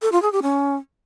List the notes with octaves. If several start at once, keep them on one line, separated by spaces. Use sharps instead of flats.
A4
F4
G#4
G4
C#4